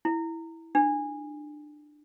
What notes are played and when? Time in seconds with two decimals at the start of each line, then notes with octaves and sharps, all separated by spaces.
0.05 E4
0.75 D4